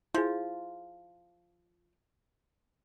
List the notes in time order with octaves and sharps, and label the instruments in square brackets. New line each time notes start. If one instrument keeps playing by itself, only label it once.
[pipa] F3 [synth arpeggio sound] E4 G#4